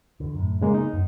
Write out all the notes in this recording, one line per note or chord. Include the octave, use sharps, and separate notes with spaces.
E2 D3
F#2 A2
C#3 G#3 A#3
B3 D#4
F#2